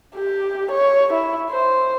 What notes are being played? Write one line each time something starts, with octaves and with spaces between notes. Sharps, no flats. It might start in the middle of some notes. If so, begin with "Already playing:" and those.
G4
C#5
E4
C5